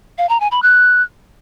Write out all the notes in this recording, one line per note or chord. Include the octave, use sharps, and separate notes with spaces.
F5
A#5
G#5
B5
F#6